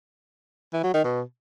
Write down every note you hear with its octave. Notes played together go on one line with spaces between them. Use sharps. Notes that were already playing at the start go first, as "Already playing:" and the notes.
E3
F#3
D#3
B2